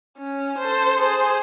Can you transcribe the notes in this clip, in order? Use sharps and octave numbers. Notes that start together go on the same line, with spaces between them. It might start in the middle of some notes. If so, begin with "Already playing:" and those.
C#4
A4 C5
G#4 C5